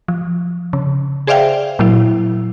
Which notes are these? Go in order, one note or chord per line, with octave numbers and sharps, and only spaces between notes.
F3
C#3
G#4 C5 D5 E5 F5 G5
A#2 F#3 E4